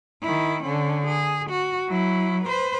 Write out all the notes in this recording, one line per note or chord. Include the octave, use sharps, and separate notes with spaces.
D#3 E4
D3 C#4
G#4
F#4
F#3 E4
B4 C5